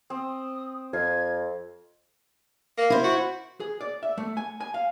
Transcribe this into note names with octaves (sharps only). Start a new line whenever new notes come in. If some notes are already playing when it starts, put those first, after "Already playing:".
C4 D#6
F2 F5 G#6
A#3
E4 C5
F#4
G#4
D5
E5
A3
G#5
G#5
F5